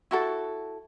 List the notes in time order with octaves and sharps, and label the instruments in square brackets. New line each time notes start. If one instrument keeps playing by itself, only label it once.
[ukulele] E4 F#4 A4